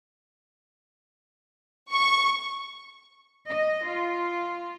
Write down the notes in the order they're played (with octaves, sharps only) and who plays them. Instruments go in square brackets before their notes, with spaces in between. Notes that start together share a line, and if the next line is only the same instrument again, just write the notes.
[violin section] C#6
[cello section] D#5
F4